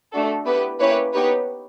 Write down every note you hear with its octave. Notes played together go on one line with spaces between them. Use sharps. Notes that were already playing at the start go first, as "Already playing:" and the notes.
A3 D4 F#4 A4
B3 E4 G4 B4
A#3 C#4 E4 G4 B4 C#5
B3 D#4 G4 B4 C#5